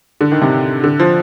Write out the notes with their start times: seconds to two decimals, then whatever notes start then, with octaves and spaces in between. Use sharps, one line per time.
0.21 D3
0.32 D#3
0.42 C3
0.84 D3
1.00 F3